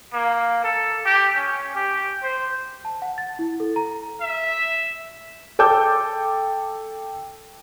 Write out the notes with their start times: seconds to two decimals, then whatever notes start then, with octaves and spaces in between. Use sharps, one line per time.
0.13 A#3
0.64 A4
1.06 G4
1.36 C#4
1.75 G4
2.23 C5
2.85 A5
3.02 F#5
3.18 A6
3.39 E4
3.60 A4
3.76 A#5
4.21 E5
5.59 A4 G5 A5 D6 E6 G6